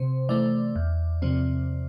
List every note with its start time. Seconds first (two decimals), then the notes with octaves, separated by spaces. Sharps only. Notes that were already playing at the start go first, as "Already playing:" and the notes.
Already playing: C3 C5
0.29 E3 A3 D5
0.76 E2
1.22 C3 F3 C4